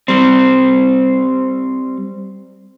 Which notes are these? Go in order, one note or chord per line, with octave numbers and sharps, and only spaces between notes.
G3 C4